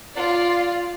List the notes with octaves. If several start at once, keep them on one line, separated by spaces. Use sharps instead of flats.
F4 D5